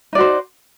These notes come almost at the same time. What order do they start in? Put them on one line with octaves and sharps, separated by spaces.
D#4 D5 F#4 C5